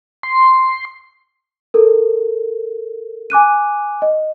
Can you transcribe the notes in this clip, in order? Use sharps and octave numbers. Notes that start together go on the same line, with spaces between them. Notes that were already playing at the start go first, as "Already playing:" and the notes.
C6
A4 A#4
G#5 D6 F#6 D#7
D#5